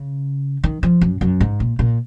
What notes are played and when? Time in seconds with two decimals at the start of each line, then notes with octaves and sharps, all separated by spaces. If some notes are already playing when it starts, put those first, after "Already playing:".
Already playing: C#3
0.64 D#3
0.83 F3
1.01 F#2
1.21 F#2
1.40 G#2
1.60 A#2
1.79 A#2